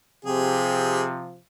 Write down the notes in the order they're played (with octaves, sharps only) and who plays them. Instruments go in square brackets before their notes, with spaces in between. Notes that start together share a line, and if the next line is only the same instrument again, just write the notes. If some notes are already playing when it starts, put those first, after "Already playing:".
[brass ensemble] C3 F3 [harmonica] G4 G#4